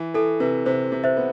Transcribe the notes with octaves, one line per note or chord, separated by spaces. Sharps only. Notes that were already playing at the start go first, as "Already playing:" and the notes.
Already playing: E3
E3 A4
C3 B4
C3 C5
C3
C5 E5
B3